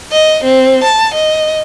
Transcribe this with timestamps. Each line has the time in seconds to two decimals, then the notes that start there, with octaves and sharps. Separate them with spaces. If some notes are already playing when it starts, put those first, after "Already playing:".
0.12 D#5
0.44 C4
0.84 A5
1.14 D#5